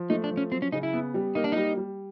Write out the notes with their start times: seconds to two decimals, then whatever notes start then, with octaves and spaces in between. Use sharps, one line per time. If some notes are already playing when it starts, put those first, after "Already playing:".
Already playing: F3
0.10 A3 D#4
0.24 D4
0.31 F3
0.37 C#4
0.51 F#3 C4
0.62 C#4
0.72 C#3 D#4
0.83 E4
0.93 B3
1.14 G3
1.35 A#3 D#4
1.44 D4
1.52 G3 D#4
1.77 G3